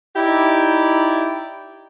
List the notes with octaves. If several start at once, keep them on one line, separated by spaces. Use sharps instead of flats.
D#4 E4 G4 D5